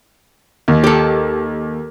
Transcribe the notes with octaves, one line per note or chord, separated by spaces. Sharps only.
D#2
G4 A4